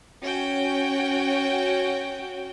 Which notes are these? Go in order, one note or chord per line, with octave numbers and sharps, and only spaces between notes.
C#4 F#4 G5